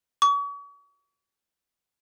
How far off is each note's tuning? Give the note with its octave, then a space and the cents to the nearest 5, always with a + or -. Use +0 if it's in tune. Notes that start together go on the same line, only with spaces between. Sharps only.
C#6 +40